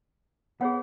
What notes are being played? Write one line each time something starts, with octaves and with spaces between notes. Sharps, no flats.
B3 G#4 C#5 F#5